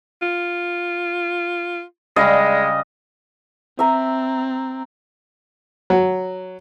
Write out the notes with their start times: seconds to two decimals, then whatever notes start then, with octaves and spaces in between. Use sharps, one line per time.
0.22 F4
2.16 C#3 G3 G#3 D#5 D6
3.79 C4 E5 A#5
5.90 F#3